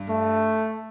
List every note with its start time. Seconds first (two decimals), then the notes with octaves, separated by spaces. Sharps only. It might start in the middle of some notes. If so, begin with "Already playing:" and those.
Already playing: G2
0.09 A3